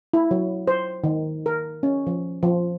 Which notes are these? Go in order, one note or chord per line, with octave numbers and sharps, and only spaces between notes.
E4
F#3
C5
D#3
A#4
C#4
F3
F3